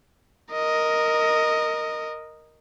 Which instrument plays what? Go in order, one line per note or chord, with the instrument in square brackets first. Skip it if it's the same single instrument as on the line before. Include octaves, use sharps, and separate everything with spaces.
[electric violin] A#4 D#5